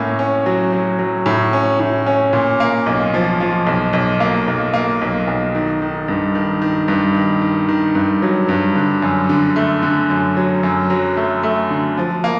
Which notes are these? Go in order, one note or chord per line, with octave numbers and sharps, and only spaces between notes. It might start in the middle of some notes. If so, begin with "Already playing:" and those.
Already playing: A2 A#3 C#4
C#4
F#3
F#3
F#3
A2
C#4
A2
C#4
A#2
A#3
B1
F3
F3
B1
B1
A#3
B1
A#3
B1
B1
D#3
D#3
G2
D#3
D#3
G2
D#3
D#3
D#3
G2
F#3
G2
D3
F#2
D3
A3
D3
F#2
F#3
F#2
F#3
A3
A3
D3
F3
A#3